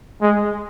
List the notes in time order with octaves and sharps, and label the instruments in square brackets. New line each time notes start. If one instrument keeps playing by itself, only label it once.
[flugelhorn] G#3